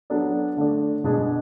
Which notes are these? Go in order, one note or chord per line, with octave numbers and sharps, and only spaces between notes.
F#3 B3 D4 A4 D5
D3 A3 D4 A4 D5
B2 G#3 B3 D4 G#4